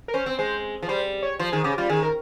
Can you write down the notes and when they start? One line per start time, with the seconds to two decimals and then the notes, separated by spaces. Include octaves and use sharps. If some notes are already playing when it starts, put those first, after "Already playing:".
0.08 A#4
0.14 C#4 C5
0.26 C4
0.38 G#3 C5
0.82 F3
0.89 G3 C5
1.22 C#5
1.39 F3 C5
1.52 D#3 G#4
1.64 C#3 G4
1.78 G3 F4
1.89 D#3 G#4
2.03 A#4